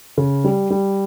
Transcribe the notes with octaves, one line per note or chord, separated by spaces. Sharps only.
C#3
G3
G3